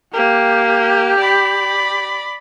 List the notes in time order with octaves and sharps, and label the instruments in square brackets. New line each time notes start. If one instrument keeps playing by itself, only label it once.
[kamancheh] A#3 [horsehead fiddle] G4
[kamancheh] D5 B5